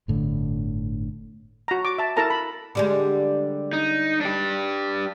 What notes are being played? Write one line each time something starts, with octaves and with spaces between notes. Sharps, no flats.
G1 A2 D3
F#4 A#5
D6
E5 A5
E4 A4 A#4 A5 A#5
B5
D3 G3 G#3
D#4
D4 G4